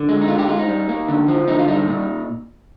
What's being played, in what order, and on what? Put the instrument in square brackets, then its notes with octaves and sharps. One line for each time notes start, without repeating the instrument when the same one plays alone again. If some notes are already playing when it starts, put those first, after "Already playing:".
Already playing: [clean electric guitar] D3
G#3
D#4
D3 F4
D#4 G4
G#3 F4
D#4
G3
A#3
D3
F3
D3 D#4
F4
G3 D#4
A#2